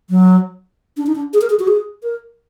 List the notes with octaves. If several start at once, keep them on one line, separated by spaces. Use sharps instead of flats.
F#3
D4
D#4
D4
G#4
A#4
G#4
F#4
G#4
A#4